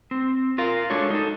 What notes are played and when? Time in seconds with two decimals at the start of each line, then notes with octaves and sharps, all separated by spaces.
0.11 C4
0.58 F4 A#4 F5
0.90 G#3 D4 F#4 A4 C#5
1.10 D#4 A4